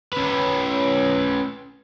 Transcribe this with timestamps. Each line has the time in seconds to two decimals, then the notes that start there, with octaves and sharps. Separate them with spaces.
0.13 C#4 B4